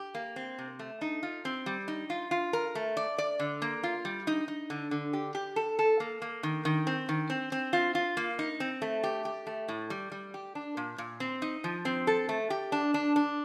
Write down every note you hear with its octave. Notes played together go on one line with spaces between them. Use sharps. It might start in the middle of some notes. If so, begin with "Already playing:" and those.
Already playing: G4
A#3
C4
C3
A3
D#4
F4
C4
G3
D#4
F4
F4
A#4
A3
D5
D5
D3
A#3
F4
G3
D#4
D#4
D3
D3
G4
G4
A4
A4
A#3
A#3
D#3
D#3
C4
D#3
C4
C4
F4
F4
A#3
D#4
C4
A3
G4
G4
A3
A2
G3
G3
G4
D4
A#2
A#2
C4
D#4
F3
C4
A4
A3
G4
D4
D4
D4